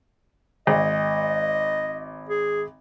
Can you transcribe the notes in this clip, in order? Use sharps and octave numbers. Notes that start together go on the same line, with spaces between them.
G#1 D#5
G#4